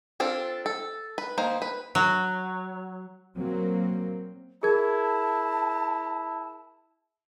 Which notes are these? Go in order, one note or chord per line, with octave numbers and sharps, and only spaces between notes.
C4 D4 F4 A4
A4
B4
D#3 A#3 C5
B4
F#3
F#3 A#3 C4
E4 G#4 A#4 A5 G#6